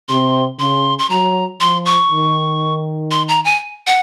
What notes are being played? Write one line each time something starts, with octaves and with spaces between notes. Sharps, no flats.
C3 C6
C#3 C6
C6
F#3 A#5
F3 C6
C#6
D#3
C6
A#5
G#5
F#5